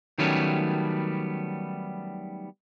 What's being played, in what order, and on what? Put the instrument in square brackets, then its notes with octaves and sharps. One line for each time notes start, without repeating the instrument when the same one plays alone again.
[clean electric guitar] D#3 F#3 G3 A3 B3 C#4